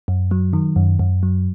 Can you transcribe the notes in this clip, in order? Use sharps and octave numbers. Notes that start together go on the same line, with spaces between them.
F#2
F#3
D#3
F#2
F#2
F#3